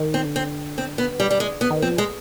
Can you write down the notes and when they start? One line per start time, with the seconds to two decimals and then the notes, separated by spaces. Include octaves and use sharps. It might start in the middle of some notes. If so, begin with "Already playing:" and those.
Already playing: D#3
0.14 C4
0.25 D3
0.36 C4
0.78 C4
0.98 B3
1.20 G3
1.31 G3
1.40 G#3
1.61 B3
1.71 D#3
1.82 F3 C4
1.98 G#3